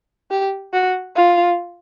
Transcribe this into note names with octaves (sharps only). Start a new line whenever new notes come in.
G4
F#4
F4